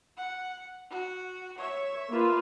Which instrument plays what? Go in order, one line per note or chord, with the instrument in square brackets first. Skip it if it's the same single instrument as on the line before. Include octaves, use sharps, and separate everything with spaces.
[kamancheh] F#5
F#4
[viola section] C#5 [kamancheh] E5
[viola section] A#3 F4 B4